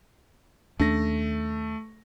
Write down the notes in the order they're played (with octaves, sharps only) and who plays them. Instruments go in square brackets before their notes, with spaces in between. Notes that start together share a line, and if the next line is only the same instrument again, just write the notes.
[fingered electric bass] D#2 C#4 D4 [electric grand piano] A3 A#6